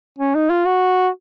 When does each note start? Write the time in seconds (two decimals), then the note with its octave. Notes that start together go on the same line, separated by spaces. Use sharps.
0.19 C#4
0.35 D#4
0.50 F4
0.65 F#4